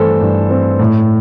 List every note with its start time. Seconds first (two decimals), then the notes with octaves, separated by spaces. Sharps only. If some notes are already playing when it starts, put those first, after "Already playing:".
Already playing: G2 E3 A3 C4 A4 C5
0.21 G2
0.50 C4
0.79 A2